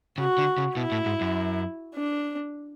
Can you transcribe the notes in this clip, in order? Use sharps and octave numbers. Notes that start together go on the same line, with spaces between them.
C#3 F#4
D3
C#3
B2 E4
A2
G#2
F#2
D4